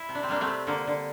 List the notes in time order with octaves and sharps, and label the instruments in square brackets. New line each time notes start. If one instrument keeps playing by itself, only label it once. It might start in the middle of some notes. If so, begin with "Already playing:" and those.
Already playing: [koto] E4
C3
D4
C4
G3 A#3 D4
A3 C4
C3
D3 A#3
D3